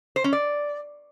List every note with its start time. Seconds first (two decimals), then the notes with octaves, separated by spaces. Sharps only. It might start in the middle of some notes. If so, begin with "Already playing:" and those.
0.16 C5
0.24 C#4
0.33 D5